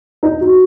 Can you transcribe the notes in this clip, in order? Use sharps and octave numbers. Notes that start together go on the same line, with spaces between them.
D#4
F#4